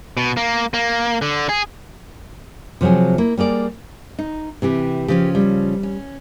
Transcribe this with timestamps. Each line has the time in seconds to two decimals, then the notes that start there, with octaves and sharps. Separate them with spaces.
0.17 B2
0.37 A#3
0.74 A#3
1.22 D3
1.49 G#4
2.81 C3 F3 F#3 C4 G#4
3.18 A#3 E4
3.37 G3 A#3 G#4 D5
4.19 D#4
4.62 C3 E3 G4
5.08 C#3 F3 C#4 G4
5.35 G3
5.83 C#4